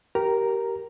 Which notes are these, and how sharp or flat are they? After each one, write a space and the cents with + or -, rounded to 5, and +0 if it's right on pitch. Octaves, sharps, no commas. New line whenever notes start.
G4 -20 A#4 +0 A#5 +0